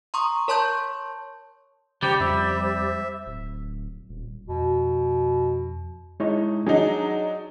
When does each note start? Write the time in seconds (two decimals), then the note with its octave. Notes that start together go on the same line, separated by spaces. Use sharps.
0.14 A#5 C6 C#6 D#6
0.48 A#4 C#5 A5 C6 C#6 G6
2.03 C#3 G3 G4 C5
2.20 F2 E5
3.26 D1
4.09 D#1
4.48 F2 B2
6.20 G#3 D#4 E4 C#5
6.67 F#3 D4 D#4 G#4